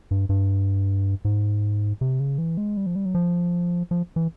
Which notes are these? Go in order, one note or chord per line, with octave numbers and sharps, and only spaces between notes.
G2
G2
G#2
C3
C#3
E3
G#3
G3
F3
G3
F#3
F3
F3
E3